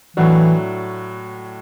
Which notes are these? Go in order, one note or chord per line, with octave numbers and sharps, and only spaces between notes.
A2 E3 F#3 D4 F#4